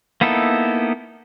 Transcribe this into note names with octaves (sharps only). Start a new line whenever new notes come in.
A#3 B3 D#4 E4 A4